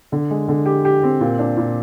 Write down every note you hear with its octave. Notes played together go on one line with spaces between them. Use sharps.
D3
G#3
D3
G4
G4
C4
A#2
D4
A#2